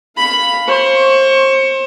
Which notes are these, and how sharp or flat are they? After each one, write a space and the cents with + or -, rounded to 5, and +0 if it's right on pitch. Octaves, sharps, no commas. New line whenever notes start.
F5 +0 B5 +5
C5 +35 C#6 +15